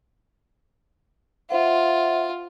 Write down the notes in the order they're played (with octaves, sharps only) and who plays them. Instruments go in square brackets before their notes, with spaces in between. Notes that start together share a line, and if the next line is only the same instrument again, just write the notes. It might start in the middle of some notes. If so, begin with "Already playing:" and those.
[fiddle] F4 [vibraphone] C5 E5 F#5